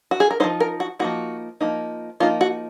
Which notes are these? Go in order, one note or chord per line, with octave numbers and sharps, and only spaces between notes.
F#4
G#4
A#4
F3 A#3 D#4 C5
A#4
F#4
F3 A#3 D#4 F#4
F3 A#3 D#4
F3 A#3 D#4 F4
F#4